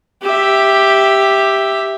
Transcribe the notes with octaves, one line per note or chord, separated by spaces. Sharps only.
G4 E5